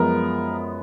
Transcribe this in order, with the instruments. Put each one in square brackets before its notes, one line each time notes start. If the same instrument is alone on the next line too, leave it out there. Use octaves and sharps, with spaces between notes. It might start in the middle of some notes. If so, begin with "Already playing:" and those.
Already playing: [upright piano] F#2 F3 G#3 B3 A#4